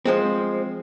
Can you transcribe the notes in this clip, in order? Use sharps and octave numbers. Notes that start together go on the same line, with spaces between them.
F3 G#3 C4